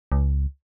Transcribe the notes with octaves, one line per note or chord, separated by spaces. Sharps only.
C#2